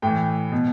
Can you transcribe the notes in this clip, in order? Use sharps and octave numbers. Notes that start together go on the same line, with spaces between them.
A2 E3 G5
B2